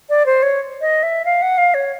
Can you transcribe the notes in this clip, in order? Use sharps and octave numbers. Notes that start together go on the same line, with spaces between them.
D5
C5
C#5
D#5
E5
F5
F#5
F5
C#5